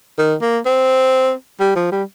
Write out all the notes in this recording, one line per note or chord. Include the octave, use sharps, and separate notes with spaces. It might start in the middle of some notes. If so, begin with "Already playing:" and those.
D#3
A#3
C4
G3
F3
G3